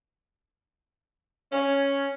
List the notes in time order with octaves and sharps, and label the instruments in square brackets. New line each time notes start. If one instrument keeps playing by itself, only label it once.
[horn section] C#4